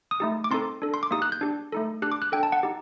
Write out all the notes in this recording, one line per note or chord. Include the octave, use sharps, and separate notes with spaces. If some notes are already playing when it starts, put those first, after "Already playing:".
D#6
A3 D#4 G4
D6
C4 D#4 A4 C6
D4 A4
C6
D6
A#3 D#4 G4 D#6
F#6
G6
D4 G4
A3 D#4 A4
D4 G4 F#6
D6
F#6
D4 A4 G5
A5
F#5
D#4 G4